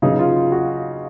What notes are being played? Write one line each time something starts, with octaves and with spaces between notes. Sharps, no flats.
C#3 F#3 B3 D#4
F4
F4
F#4